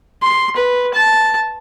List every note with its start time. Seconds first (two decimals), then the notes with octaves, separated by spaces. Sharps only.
0.23 C6
0.56 B4
0.94 A5